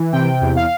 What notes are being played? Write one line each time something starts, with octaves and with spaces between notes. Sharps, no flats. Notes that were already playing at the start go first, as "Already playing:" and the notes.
Already playing: E3
C3 G5
E2
F5